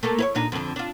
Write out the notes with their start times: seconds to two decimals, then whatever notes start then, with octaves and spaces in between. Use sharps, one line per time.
0.03 A3 A#3 A4
0.19 E4 B4 C#5
0.35 A#2 D4 D#4
0.52 F2 D3
0.76 D4 F4